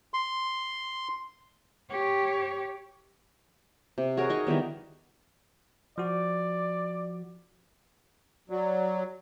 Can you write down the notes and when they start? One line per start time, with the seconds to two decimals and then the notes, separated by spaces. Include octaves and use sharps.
0.14 C6
1.90 G4 C#5
3.98 C3
4.17 F#4 G#4 A#4 C#5
4.29 D#4 D#5 C#6
4.47 D#3 E3 G3 B3
5.98 F3 F#4 D5
8.50 F#3 D5